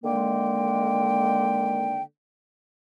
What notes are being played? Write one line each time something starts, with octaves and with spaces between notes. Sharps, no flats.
D3 D#3 G#3 A#3 G5